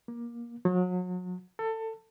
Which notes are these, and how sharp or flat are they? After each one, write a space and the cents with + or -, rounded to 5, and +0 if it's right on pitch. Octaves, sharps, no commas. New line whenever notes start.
A#3 +20
F#3 -35
A4 +25